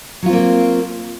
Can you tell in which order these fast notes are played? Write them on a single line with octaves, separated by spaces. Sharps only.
F#3 F4 C4 A#3